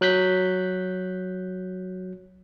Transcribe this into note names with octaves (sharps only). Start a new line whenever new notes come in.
F#3 F#6 G6 B6